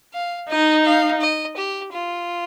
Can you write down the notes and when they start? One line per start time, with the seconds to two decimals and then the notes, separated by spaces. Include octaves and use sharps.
0.14 F5
0.50 D#4 D#5
0.85 F5
1.21 D#5
1.57 G4
1.92 F4